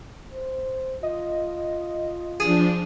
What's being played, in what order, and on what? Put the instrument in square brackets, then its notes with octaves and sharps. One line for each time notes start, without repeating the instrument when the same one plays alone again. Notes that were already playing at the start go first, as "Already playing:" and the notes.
[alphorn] C5
[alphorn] F4 [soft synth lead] D#5
[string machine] F3 D4 [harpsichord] G#4